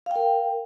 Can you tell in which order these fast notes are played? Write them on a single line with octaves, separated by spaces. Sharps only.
F5 G5 A#4